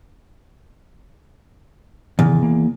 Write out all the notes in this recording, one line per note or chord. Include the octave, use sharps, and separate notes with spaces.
E2 C3 D#3 E3
A#3